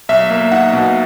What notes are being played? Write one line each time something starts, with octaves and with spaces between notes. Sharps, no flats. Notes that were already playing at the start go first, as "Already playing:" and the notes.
B1 E5
A#3
D#4 F#5
B2